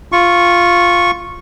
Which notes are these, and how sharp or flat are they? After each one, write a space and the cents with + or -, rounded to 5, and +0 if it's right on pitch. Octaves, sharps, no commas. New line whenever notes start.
F4 +0 C#6 -10